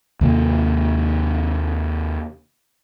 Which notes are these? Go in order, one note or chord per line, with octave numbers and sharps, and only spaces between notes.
D#2 C3 A#3